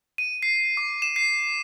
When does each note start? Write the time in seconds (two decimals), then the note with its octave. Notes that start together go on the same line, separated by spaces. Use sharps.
0.18 D#7
0.43 C7
0.77 D6
1.02 E7
1.16 C7